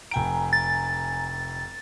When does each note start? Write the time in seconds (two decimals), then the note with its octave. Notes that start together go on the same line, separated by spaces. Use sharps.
0.11 F1 G5 G#5 A#5 D7
0.53 A6